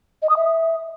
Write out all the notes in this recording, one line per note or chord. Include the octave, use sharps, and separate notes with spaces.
D#5
D#6
E5